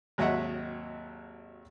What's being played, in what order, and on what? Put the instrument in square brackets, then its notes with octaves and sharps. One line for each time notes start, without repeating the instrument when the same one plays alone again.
[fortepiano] G#1 D#2 F#3 D#5 E5 F#5